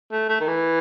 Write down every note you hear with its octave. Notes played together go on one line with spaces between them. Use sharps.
A3
A3
D#3
E3